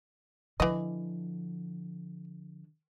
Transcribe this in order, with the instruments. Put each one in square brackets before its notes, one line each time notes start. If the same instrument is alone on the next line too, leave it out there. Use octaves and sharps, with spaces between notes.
[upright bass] D3 F3 [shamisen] E3 D#5